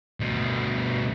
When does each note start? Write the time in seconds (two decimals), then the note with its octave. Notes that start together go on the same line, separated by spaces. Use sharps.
0.20 D2 B2